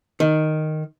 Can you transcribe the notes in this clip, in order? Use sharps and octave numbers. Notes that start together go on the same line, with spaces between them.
D#3